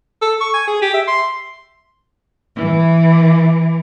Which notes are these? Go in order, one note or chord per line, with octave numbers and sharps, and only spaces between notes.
A4
C#6
G#5
G#4
G4
E5
C6
E3